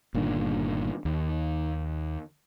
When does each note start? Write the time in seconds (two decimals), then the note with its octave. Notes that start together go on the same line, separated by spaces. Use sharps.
0.14 G1 A#2 D#3 D4
1.05 D#2